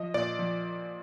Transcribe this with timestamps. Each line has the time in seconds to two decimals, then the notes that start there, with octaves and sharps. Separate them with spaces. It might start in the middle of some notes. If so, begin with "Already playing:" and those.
Already playing: F3 D#5
0.14 A#2 D5
0.39 F3